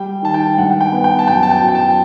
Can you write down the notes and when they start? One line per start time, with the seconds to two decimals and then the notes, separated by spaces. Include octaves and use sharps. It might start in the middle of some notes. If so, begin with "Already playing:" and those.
Already playing: G3 G5
0.22 D#3 A5
0.34 G5
0.57 G2 F#5
0.80 G5
0.92 B3
1.04 G5
1.19 A5
1.27 F#2 G5
1.43 A5
1.51 G5
1.62 F#2
1.68 G5
1.75 A5